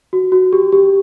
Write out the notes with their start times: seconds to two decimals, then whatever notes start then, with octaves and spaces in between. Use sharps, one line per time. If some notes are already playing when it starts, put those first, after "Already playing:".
0.13 F#4
0.32 F#4
0.53 G4
0.72 G4